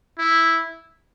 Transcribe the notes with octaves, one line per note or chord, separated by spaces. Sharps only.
E4